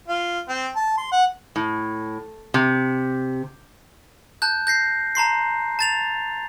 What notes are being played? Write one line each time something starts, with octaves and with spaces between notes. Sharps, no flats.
F4
C4
A5
C6
F#5
A2
C3
A5 F#6 G6
G6 A#6 C7
A5 A#5 C6 C7
A5 A6 F7